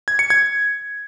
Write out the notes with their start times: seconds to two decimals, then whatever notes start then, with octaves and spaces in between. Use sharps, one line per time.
0.08 G#6
0.19 C#7
0.30 G#6